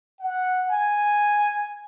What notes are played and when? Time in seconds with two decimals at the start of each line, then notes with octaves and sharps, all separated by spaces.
0.20 F#5
0.69 G#5